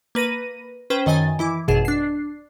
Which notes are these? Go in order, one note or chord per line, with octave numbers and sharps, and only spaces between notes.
A#3 B4 A#6 D#7
C#4 B4 C5 G5
F#2 D#3 D#5 G#5 A6
E3 E4 D6
G#1 F#2 B2 G#4 E7
D4 C7